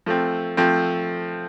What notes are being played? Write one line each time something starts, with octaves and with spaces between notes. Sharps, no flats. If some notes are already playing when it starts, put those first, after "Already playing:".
F3 A3 C4
F3 A3 C4